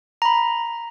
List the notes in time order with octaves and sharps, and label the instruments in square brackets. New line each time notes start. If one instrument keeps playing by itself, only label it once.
[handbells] A#5 B5